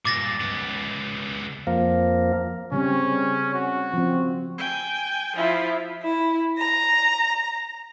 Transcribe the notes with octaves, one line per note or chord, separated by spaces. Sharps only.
G2 A#2 D6 A6 A#6
C#2 B3
F2 F3 A#3
C#3 G3 C4 C#4
F#4
F3 C4
G5 G#5
F3 E4 F4
E4
A#5